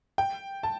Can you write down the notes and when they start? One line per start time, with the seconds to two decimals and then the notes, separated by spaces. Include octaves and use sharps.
0.18 G5
0.63 A5